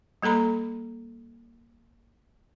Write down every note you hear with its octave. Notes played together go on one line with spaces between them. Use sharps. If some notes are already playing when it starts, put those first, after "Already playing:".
G3 A#3 A4 A#5 B5